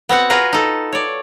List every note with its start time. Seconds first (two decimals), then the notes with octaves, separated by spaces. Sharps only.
0.09 B3 C4 F#4 F#5
0.30 F4 F#4 G#4 A#4 B4 F5
0.53 D#4 A4
0.92 C#5 D5